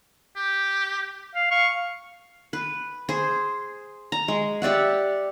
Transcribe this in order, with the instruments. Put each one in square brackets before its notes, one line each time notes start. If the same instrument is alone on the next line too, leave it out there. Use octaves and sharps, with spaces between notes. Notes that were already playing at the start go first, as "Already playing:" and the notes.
[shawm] G4
[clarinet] F5
[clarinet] F5 [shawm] C#6
[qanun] B4
G#4 C5
A#5
G#3
G4 D5 E5 F#5